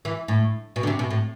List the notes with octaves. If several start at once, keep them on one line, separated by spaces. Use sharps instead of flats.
E3
A2
B2
D3
C3
B2
A2